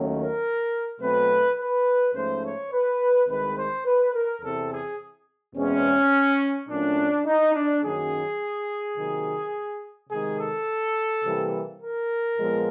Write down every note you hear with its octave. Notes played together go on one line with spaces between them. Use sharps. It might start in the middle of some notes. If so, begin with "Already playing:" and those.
Already playing: D#2 D#3 F#3 A3 C#4
A#4
B2 F#3 A3 C4 B4
B4
G#2 F3 A3 C#4 C5
C#5
B4
C2 C3 D#3 G#3 B4
C5
B4
A#4
E2 C3 E3 A4
G#4
E2 B2 G#3 C4 C#4
A#2 F#3 A3 C#4 D4
D#4
D4
F#2 D#3 F#3 A#3 C#4 G#4
C3 D#3 F#3 A#3
C3 D#3 G#3 G#4
A4
C3 E3 G3 A#3
A#4
A#2 F3 G#3 B3